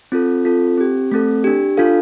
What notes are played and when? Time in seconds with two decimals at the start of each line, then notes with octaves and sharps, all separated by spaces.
0.12 C4 F4 A4
0.45 C4 F4 A4
0.78 C4 G4
1.12 A3 C4 A4
1.44 D4 G4
1.77 D4 F4 A4 F5